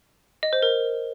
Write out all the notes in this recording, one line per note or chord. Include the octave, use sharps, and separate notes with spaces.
D#5
C5
A#4